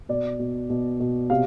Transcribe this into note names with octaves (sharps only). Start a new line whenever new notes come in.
B2 D5
B2
B2
B2
C3 F5